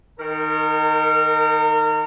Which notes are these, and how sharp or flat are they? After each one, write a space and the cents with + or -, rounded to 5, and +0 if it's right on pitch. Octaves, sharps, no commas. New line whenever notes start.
D#3 +0 A#4 -35